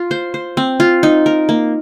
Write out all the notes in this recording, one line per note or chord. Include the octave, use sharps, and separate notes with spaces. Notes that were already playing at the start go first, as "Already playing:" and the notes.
Already playing: F4
C5
C5
C4
F4
D#4
A#4
A#3